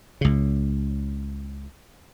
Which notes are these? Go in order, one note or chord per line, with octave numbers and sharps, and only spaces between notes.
C#2 C#3